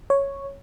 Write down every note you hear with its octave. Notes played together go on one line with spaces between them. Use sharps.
C#5